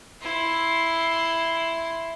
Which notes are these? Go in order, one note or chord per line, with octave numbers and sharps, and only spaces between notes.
E4 C6